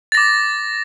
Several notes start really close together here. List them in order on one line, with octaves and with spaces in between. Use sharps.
A6 A#6 D6